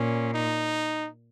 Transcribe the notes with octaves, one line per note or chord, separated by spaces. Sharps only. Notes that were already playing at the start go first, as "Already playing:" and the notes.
Already playing: A#2 C#4
D#4